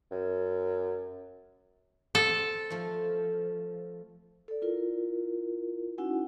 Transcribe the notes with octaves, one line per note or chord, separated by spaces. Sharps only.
F#2
C4 A4
F3 A3
A4 D5
E4 F4 A#4
C#4 D#4 E4 F#4 F#5 G#5